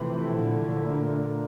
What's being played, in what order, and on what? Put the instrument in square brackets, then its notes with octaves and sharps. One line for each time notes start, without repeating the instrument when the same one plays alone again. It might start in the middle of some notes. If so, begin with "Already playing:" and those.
Already playing: [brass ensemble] A2 F3 A3 E4 [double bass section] C3 E3
[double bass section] A#2 D3
[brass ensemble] A3 D4 F4 A#4